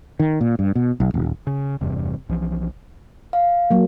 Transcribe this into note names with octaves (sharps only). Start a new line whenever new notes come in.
D#3
A#2
G2
B2
B1
D#1
C#3
F1 E2 G2 C3
B1 E3 F3
F5
F#3 A#3